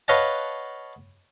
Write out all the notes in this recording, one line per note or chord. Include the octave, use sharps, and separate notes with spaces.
B4 C#5 D#5 F5 F#5 A5